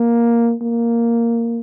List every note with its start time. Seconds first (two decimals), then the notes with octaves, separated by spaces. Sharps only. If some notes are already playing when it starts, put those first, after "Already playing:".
Already playing: A#3
0.62 A#3